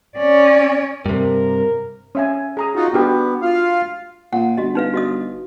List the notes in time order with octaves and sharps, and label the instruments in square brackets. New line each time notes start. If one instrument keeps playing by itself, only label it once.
[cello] C#4 D5
[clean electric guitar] G2 C3 [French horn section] A#4
[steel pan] C#4 E5 G#5
G#4 A#5 D#6
[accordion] D#4 F4 F#4
[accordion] B3 [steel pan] D4 F#4 G4
[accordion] F4 F5
[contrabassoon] A#2 [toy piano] F#5
[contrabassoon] G1 [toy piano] F#4 D#5
[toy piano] D#4 B4 F5
F#4 D#5 D#6